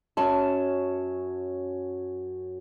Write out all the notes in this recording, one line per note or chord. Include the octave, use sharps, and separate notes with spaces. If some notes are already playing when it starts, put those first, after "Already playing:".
F#2 F#3 C#4 A5